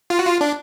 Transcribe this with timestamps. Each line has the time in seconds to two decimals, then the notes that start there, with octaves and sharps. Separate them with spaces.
0.10 F4
0.19 F#4
0.27 F4
0.41 D4